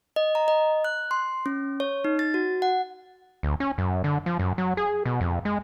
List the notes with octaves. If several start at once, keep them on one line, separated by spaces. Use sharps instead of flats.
D#5
A#5
D#5
F#6
C6
C#4
C#5
D#4
A6
F#4
F#5
D2
C#4
F#2
D3
F3
F#2
F#3
G#4
B2
F2
G#3